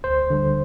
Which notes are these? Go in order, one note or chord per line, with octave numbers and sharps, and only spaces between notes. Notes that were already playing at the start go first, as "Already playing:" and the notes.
D2 C5
D3 G3